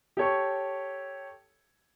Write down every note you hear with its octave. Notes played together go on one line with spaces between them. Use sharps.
G4 A4 C#5 C#6